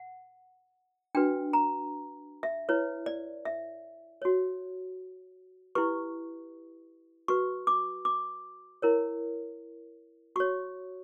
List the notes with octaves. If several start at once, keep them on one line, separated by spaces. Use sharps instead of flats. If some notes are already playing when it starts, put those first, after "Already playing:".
Already playing: F#5
D4 F#4 B4 G5
A#5
E5
E4 B4 C#5
D5
E5
F#4 C#5
E4 G4 B4 C#6
F#4 B4 C#6
D6
D6
E4 A#4 C#5
F#4 C#5 C#6